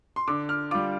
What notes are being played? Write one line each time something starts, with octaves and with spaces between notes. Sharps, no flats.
C6
D3 D6
F6
G3 F4 D6